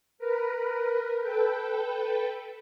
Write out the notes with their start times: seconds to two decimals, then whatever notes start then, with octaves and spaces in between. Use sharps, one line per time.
0.18 A#4 B4
1.19 A4 B4 G5